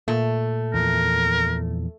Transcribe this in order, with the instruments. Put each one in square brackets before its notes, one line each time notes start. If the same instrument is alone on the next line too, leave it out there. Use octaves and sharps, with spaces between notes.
[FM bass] A#2 [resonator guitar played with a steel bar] A3
[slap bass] E2 F3 [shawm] A#4